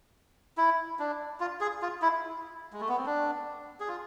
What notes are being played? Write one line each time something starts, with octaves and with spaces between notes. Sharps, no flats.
E4
D4
F4
G#4
F4
E4
G#3
A3
B3
C4
D4
G#4
F4